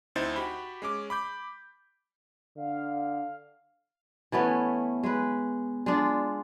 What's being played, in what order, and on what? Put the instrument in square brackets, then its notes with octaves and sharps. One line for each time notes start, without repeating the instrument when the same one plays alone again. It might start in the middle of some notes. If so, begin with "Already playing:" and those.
[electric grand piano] D2 C4 D#4 E4 C5 A6
F#4 G4 B5
G#3 C#4 D6
B5 D6 G6
[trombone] D3 [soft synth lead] F5
[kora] E3 A3 B3 C#4
G#3 B4
G#3 D4 F4